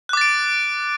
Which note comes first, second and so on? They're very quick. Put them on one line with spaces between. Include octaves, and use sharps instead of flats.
F#6 D6 A6 D7